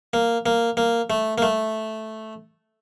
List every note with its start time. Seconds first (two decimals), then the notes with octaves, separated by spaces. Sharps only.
0.13 A#3
0.46 A#3
0.77 A#3
1.10 A3
1.38 A#3
1.42 A3